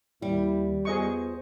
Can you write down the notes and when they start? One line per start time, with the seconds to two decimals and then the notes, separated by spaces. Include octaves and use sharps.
0.22 D#2 D#3 G3 E4
0.85 E2 B3 F4 G#4 C5 D#5 C#6